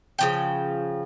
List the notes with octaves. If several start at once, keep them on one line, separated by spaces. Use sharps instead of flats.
C#3 F3 G5